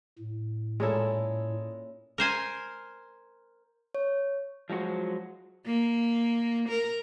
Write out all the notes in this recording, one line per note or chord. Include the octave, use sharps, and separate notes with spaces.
A2
A#2 G#3 C#4 E4 A4
A#4 C5 G#5
C#5
F3 F#3 G#3 F#4 C5
A#3
A#4